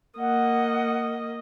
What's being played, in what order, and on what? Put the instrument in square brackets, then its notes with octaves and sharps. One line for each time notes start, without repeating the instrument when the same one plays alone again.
[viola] A#3 D#5 [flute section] F#5